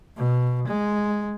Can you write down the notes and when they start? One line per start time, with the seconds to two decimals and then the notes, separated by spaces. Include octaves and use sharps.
0.16 B2
0.67 G#3